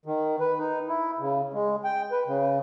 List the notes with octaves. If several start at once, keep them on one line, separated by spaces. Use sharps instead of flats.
D#3
B4
D#4
E4
C#3
G#3
G5
B4
C#3